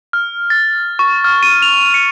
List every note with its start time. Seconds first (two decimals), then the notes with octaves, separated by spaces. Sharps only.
0.13 F6
0.50 A6
0.99 C#6
1.24 F6
1.43 D#7
1.62 F7
1.94 C#7